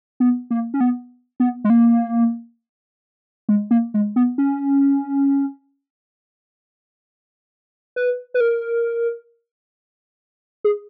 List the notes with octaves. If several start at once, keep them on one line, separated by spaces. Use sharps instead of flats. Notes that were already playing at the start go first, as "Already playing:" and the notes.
B3
A#3
C#4
B3
B3
G#3
A#3
G#3
A#3
G#3
B3
C#4
B4
B4
A#4
G#4